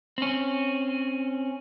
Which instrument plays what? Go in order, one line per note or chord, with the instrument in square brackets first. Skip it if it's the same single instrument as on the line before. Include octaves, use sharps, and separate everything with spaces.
[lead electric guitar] C4 C#4